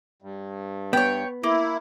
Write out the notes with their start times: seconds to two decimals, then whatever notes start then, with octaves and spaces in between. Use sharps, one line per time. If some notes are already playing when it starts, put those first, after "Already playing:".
0.22 G2
0.93 B3 C#5 G5
1.44 A#3 E4